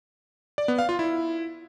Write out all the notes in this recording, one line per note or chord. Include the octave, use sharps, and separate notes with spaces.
D5
B3
F5
F4
E4